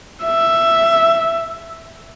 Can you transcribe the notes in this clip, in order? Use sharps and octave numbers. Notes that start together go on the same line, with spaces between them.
E5